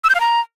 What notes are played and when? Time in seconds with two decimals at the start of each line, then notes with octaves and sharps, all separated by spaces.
0.04 E6
0.09 G6
0.15 F5
0.20 A#5